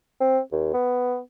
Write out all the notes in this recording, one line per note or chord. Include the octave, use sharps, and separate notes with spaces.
C4
D#2
B3